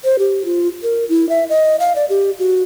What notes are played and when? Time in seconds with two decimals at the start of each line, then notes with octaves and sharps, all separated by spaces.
0.04 C5
0.19 G4
0.45 F4
0.83 A#4
1.09 E4
1.29 E5
1.49 D#5
1.80 F5
1.96 D5
2.09 G4
2.39 F#4